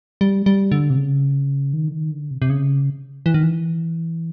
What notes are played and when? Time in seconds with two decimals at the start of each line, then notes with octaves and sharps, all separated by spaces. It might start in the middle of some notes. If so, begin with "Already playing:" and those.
0.21 G3
0.46 G3
0.72 D3
0.90 C3
0.97 C#3
1.73 D#3
1.88 D3
1.92 D#3
2.11 D3
2.31 C3
2.42 C3
2.50 C#3
3.26 E3
3.34 D#3
3.43 E3